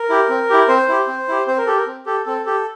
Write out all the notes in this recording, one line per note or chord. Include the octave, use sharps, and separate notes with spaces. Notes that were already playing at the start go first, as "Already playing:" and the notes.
Already playing: A#4
E4 G4
C4
E4 G4
C4 C5
E4 G4
C4
E4 G4
C4 C5
A#4
G4 A4
A#4
C4
G4 A4
C4 A4
G4 A4